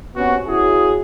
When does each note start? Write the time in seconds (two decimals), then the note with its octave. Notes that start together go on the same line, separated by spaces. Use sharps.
0.16 C3 B3 C#4 F#4
0.47 C#4 E4 F#4 G#4